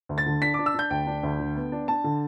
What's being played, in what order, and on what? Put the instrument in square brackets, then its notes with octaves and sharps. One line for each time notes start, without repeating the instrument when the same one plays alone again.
[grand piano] D2
A6
D3
D4 B6
D4 D6
E6
D4 G6
D2 G5
D4
D2
D3
B3
D4
D4 A5
D3